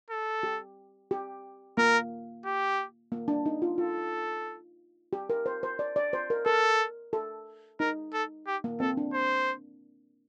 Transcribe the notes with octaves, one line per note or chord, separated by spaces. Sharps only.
A4
G4
G4
A#3 A#4
G4
A#3
D4
D#4
F4
F4 A4
G4
A#4
C5
C5
D5
D5
C5
A#4
A4 A#4
A4
D#4 A#4
A4
G4
A#3
C4 A4
D4
C5